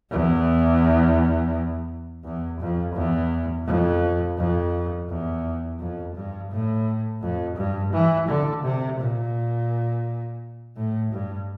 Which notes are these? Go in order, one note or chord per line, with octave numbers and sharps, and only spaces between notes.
E2
E2
F2
E2
F2
F2
E2
F2
G2
A2
F2
G2
E3
D3
C3
A#2
A2
G2